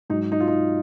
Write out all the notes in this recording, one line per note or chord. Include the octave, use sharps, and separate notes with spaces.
G#2 F#3 D#4
D#4
F4
D#4